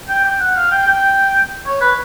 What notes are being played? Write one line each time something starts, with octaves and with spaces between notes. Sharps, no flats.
G5
G5
F#5
F5
G5
G5
C#5
B4